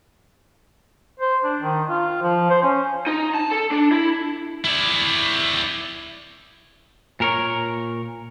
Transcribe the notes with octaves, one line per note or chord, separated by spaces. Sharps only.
C5
D4
D#3
F4
F3
C5
C#4
D#4
A5
A4
D4
E4
E4 D5
A#2 A#4 C#5